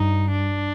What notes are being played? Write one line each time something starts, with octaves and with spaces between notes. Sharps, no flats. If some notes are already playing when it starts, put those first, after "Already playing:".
Already playing: G2 D#4
D4